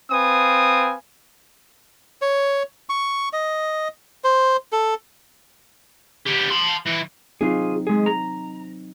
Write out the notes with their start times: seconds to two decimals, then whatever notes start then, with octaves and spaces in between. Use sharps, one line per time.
0.11 C4 B4 F5 G#5 D#6
2.22 C#5
2.89 C#6
3.33 D#5
4.24 C5
4.72 A4
6.27 B3 G4
6.51 A5 C6
6.87 E3
7.41 F#3 C4 D#4 F4 G#4
7.87 G#3 G#4
8.06 A#5